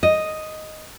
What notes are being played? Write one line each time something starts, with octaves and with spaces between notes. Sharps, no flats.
D#5